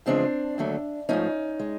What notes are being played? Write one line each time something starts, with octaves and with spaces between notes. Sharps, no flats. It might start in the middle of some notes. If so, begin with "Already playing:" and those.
E2 C#3 F3 G#3 C4 D4
D#2 D3 F#3 A3
G#2 F3 A3 C#4 D#4
G#3